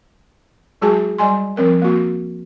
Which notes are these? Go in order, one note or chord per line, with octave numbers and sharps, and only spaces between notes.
F#3 G#3 F#4 G#4 G#5 A5
G3 D#5 G#5 C6
F3 C4 A#4 D#5
A#3 F#4